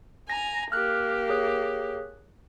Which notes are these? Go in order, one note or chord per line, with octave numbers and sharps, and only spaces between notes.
G#5 A#5 A#6
A#3 G4 F6 F#6
G#4 C#5 F#6